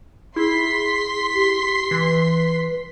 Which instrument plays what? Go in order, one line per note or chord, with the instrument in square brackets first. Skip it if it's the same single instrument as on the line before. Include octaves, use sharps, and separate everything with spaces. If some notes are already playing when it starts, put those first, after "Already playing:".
[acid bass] E4 [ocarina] G#4 [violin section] C6 B6
[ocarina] G4
[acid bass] E3 [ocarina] B4